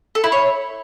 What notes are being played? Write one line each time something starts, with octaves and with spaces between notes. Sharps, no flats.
A4
E4
C#5